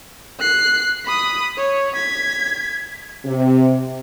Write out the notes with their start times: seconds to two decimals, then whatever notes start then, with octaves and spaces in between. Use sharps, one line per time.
0.40 F#6 C7
1.05 B5 D#6
1.58 C#5
1.96 G#6 B6
3.25 C3